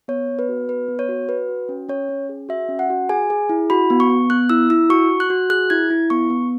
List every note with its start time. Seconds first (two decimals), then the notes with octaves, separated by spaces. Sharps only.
0.08 B3 C#5
0.28 B3
0.39 B4
0.49 F#4
0.69 B3 B4
0.88 B3
0.99 C#5
1.09 F#4
1.29 F#4 B4
1.49 F#4
1.69 C#4
1.89 C#4 C#5
2.09 C#4
2.29 G#4
2.49 F#4 E5
2.69 C#4
2.79 F#5
2.90 F#4
3.09 G#4 G#5
3.30 G#4
3.49 E4
3.70 F#4 B5
3.90 B3
4.00 C#6
4.10 B3
4.30 B3 F#6
4.50 E4 E6
4.70 E4 E6
4.90 F#4 C#6
5.10 F#4
5.20 F#6
5.30 F#4
5.50 G#4 F#6
5.70 E4 G#6
5.90 E4
6.10 B3 C#6
6.30 B3